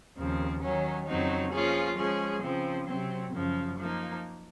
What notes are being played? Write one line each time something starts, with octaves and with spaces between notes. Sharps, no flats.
D#2 C#3 F3 C4
D#3 F#3 C#4
F2 C#3 F#3 C4 D#4
F3 A#3 C#4 F4 G#4
F3 G#3 C#4 G#4
C#3 F3 C4
C3 F#3 C4
F#2 C#3 F3
F3 A#3 D#4